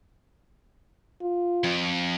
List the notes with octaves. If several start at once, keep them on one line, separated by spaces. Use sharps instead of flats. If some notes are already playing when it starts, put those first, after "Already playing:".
F4
F2